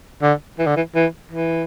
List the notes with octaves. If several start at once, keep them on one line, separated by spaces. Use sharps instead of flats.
D3
E3
D3
E3
E3
E3